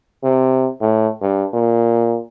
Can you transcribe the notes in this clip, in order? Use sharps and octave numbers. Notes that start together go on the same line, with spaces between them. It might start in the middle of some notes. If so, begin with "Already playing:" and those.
C3
A2
G2
A#2